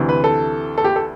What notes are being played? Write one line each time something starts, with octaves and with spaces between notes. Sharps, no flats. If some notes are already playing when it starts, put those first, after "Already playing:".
Already playing: D2 C3 E3
B4
A4
A4
G4
A4